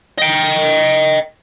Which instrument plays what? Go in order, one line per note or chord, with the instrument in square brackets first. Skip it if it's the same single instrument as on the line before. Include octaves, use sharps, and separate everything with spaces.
[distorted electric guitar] D#5 G5